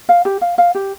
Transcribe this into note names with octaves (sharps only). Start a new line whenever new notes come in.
F5
G4
F5
F5
G4